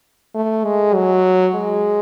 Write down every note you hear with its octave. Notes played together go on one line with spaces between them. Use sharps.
A3
G#3
F#3
G#3